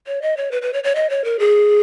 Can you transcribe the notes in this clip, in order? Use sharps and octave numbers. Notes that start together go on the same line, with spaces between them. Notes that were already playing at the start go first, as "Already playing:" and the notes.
C#5
D#5
C#5
B4
B4
C#5
C#5
D#5
C#5
A#4
G#4